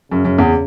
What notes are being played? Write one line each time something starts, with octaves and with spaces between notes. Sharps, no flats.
F#2 C#3
F#2
E2